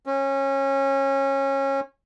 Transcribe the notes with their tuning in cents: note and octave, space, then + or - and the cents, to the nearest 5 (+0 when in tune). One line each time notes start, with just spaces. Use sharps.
C#4 -25